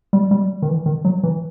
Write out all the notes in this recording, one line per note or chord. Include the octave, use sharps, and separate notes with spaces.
G3
G3
D#3
E3
D#3
F#3
E3